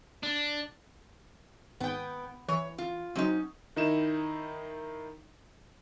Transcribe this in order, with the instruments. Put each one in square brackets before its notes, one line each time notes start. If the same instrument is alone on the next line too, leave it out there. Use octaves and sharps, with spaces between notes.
[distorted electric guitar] D4
[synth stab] G#1 G5 [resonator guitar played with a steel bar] B3
[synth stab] E3 [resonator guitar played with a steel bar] C#5
[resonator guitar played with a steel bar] F4
[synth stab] F#3 C4 [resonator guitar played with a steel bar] C#4 D#4
[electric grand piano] D#3 D#4 E4 E7